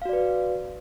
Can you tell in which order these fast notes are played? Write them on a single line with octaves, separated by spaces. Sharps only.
F5 F#4 D5 B4